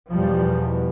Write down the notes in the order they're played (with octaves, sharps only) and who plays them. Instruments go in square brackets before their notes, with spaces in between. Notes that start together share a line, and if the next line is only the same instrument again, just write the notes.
[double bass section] E2 B2 F3 G3